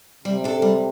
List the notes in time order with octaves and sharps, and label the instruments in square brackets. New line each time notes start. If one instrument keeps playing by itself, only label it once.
[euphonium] C3 [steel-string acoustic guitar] G3
[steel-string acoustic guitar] D4 A4
G3